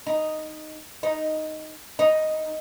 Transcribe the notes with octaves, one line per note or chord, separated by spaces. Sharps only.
D#4
D#4
D#4